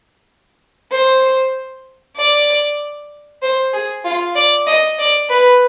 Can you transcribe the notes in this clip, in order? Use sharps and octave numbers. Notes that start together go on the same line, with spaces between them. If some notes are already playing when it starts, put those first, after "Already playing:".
C5
D5
C5
G#4
F4
D5
D#5
D5
B4